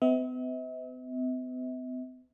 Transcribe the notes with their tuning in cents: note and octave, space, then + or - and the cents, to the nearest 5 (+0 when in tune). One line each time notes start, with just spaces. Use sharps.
B3 +45 E5 -45